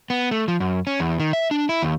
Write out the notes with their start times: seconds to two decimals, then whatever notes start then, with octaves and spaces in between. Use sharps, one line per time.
0.10 B3
0.31 A3
0.48 F3
0.60 F#2
0.87 C#4
1.00 E2
1.20 D#3
1.33 E5
1.51 D4
1.69 E4
1.82 D#2